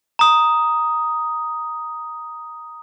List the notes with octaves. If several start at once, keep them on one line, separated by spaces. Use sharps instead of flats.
A#5 D#6